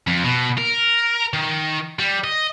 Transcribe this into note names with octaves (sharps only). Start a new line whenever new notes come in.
F2
B2
A#4
D#3
G3
D#5